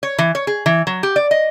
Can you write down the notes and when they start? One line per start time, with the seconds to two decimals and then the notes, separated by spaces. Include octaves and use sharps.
0.03 C#5
0.18 E3
0.35 C#5
0.47 G#4
0.66 E3
0.87 F#3
1.03 G4
1.16 D5
1.31 D#5